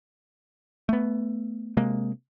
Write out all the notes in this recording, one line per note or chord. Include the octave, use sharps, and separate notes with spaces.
A3 B3
C3 G#3 A#3